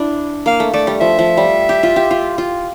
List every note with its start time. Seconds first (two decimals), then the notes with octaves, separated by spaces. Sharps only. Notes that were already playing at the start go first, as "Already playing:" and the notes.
Already playing: D4 E4
0.46 A#3 F5
0.60 A3
0.74 A3 D5
0.87 G3
1.00 F3 E5
1.19 F3
1.37 G3
1.69 G4
1.83 F4
1.96 G4
2.11 F4
2.38 F4